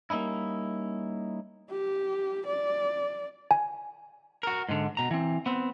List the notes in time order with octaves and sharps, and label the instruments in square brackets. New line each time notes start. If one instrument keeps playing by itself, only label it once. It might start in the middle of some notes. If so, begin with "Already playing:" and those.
[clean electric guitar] G3 A#3 C#4 D#4 E4
[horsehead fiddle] G4
D5
[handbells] G#5
[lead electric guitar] F#4 A#4
G#2 D3
B2 A#5
E3 C4
B3 C4